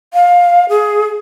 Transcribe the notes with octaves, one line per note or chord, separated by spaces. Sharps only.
F5
G#4